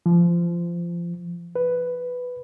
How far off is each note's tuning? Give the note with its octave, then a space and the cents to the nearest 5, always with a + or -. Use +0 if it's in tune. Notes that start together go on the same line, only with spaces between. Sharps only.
F3 -25
B4 +5